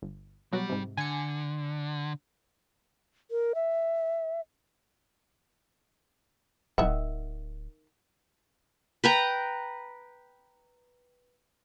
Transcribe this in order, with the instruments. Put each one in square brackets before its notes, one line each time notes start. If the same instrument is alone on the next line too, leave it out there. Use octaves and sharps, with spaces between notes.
[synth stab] G1
[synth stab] B2 F#3 F#4 [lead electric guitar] G3
[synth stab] G#2 C3
[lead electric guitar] D3 [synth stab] G#5 C#7
[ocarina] A#4
E5
[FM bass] D1 [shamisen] D#3 E5 F#5
[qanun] B4 G5 A#5